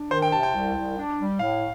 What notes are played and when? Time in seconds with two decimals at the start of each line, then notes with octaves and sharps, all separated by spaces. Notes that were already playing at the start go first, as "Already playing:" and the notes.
Already playing: D4
0.11 D#3 C5
0.22 G5
0.32 C3 A5
0.43 G5
0.54 C2
0.75 C2
0.97 D4
1.19 G3
1.39 A2 F5